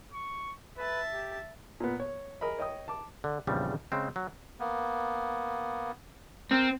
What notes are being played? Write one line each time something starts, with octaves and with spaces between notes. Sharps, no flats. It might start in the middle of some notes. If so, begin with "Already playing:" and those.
C#6
B4 E5 A5
G4
A#2 B3
C#5
G#4 A#4 D#5 B5
C#5 D#5 G5 D#6
A5 D6
D3
A#1 E2 C#3 F3 G3
C#3 G#3 C4
F#3
A#3 B3
C4 A#4